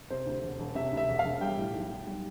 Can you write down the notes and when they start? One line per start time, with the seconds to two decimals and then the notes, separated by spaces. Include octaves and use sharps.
0.10 C3 C5
0.27 D2
0.43 E1
0.60 E1
0.75 C3 E5
0.92 D2 E5
1.09 E1
1.19 F5
1.25 E1
1.41 G3 G5
1.57 A2
1.73 B1
1.90 B1
2.06 G3